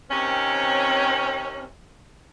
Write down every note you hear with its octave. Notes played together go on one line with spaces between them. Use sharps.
C3 D#3 C4 C#4